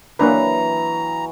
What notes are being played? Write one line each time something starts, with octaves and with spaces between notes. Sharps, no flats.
E3 F#3 A#3 D4 B4 A#5